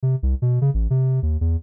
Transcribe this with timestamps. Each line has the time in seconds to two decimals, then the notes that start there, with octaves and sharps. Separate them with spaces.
0.03 C3
0.23 C2
0.42 B2
0.61 C#3
0.74 A1
0.90 C3
1.23 D#2
1.41 E2